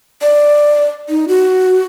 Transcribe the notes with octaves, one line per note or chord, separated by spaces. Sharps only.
D5
D#4
F#4